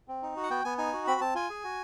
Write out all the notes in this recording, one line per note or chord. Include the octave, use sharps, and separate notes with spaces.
C4
D#4
F#4
F#5
B3 G5
B3 G#5
D#4 G#5
F#4
C4 B5
C4 A5
F4 G#5
G#4
F#4